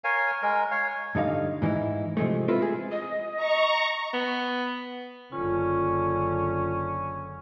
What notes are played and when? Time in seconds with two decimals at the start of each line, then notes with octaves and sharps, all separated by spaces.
0.04 A#4 C#5 F5 G#5
0.42 G#3 A#4
0.71 C#5 F5
1.15 G2 D3 D#4 F5
1.62 G#2 E3 D#4 E4
2.17 C3 F3 G#3 A3
2.48 C4 E4 F4 A4 B4
2.62 G#4
2.92 D#5
3.37 A#5 C#6
4.14 B3
5.32 F#1 D3 C#4 F4